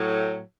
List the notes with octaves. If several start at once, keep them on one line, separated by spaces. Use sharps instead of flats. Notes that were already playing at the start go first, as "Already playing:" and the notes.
Already playing: A2 F#3